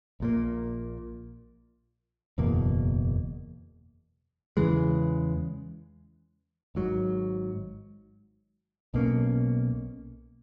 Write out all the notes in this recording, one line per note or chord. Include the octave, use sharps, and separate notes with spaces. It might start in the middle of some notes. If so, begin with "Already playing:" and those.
A#1 A#2 A#3
F#1 E2 B2 A#3
E2 C#3 E3 G#3
G#1 G#2 F#3
B1 B2 A#3 C#4